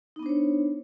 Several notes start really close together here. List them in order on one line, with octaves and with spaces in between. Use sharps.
D#4 B3 D4 C5 C#5